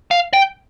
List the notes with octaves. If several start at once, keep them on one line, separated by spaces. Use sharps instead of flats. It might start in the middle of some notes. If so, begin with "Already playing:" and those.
F5
G5